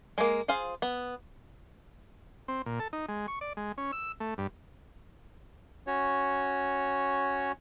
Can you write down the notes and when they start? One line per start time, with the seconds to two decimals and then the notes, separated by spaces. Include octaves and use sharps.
0.18 G#3 A#3
0.48 F4 G#4 C5 F5
0.82 B3
2.48 C4
2.66 A#2
2.80 A4
2.93 D#4
3.08 G#3
3.28 C#6
3.41 D5
3.57 G#3
3.78 C#4
3.92 E6
4.20 A3
4.38 G2
5.87 C#4 F#4 C#5